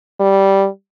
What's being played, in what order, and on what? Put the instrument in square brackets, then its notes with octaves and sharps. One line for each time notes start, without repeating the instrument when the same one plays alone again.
[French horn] G3